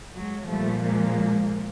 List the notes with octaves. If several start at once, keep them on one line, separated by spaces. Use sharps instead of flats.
F#3 G#3
A#2 F3 G3 A3
G#3 A#3